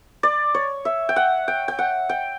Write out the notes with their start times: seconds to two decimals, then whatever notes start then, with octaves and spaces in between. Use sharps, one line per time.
0.23 D5
0.54 C#5
0.85 E5
1.09 G5
1.16 F#5
1.48 G5
1.68 G5
1.79 F#5
2.09 G5